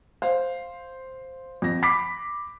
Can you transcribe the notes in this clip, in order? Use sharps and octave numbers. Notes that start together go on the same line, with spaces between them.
C5 F5
F2 A#6
B5 D6 B6 C7